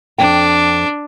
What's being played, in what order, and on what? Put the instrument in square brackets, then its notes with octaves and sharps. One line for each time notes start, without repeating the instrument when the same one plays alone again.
[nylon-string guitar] F2 C4 G5 [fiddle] D4